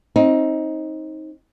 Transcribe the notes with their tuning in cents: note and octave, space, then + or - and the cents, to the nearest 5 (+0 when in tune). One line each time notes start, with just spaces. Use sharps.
C4 +35 D#4 +20